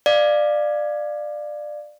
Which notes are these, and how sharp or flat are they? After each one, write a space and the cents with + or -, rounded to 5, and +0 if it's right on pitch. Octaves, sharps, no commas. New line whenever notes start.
D5 +20 F5 +0